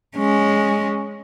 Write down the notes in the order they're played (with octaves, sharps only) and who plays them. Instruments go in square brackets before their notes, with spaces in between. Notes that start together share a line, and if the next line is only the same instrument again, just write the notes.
[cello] G#3 C#4